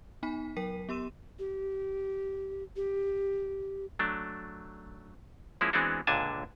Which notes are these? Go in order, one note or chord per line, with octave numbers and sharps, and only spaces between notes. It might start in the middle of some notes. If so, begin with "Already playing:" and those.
B3 D#4 G#5 B5 B6
F#3 A#4 G5 B6 D#7
B3 G4 C6 E6 D#7 E7
G4
G4
F#3 A3 D4
F3 G#3 A#3 C#4 E4
E3 G#3 B3 C4 D4 F#4
C#2 A#2 D3 D4 G#5 A5